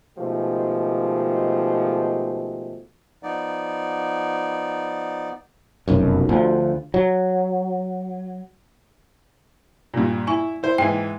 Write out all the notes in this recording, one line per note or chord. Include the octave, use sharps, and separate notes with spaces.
B2 D#3 F3 G#3 A3 G4
F3 B3 D#4 D5
F1 B1 F#2
D2 D3 F3
F#3
G2 A#2
E4 G#5 C#6
E4 C5
G#2 E3 G5